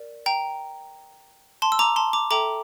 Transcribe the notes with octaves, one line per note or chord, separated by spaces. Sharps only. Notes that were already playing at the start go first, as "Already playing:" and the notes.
Already playing: A#4 D5
G5 A#5
A5 C6
E6
A#5 D6
A5 C6
A#5 D6
A4 E5 G5 A#5 D6